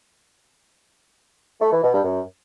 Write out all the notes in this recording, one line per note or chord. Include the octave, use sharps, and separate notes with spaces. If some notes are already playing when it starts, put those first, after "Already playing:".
A3
E3
B2
G2
F#2